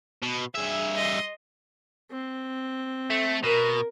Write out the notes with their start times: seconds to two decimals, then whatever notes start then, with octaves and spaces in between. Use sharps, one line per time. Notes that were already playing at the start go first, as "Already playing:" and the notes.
0.22 B2
0.55 G2 G#4 E5
0.96 D#5 C6
2.11 C4
3.10 A3
3.43 B2 A#4